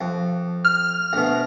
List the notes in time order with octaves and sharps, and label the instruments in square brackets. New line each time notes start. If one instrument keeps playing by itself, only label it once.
[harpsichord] F2
[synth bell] F6
[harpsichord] D2 B2